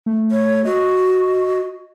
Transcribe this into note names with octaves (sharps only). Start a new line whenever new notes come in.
A3
C#5
F#4 D#5